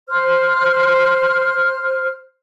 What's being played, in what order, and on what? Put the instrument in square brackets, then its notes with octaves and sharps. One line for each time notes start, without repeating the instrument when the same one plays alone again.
[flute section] C5 F6